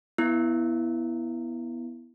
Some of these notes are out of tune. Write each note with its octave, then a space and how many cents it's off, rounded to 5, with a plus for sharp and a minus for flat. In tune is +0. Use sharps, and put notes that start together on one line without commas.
B3 -10 E4 +0